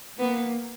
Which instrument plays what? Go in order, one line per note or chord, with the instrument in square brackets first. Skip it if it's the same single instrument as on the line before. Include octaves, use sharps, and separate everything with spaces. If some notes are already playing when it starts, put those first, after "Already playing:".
[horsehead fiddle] A#3 [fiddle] B3